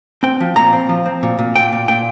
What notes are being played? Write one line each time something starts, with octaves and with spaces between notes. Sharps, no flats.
C4 G5
F3
A#2 A#5
C4
F3
C4
A#2
A#2
A#2 G5
A#2
A#2 G5